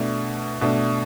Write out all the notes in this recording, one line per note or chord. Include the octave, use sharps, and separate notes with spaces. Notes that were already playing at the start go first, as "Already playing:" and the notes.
Already playing: B2 A3 D4
B2 A3 D4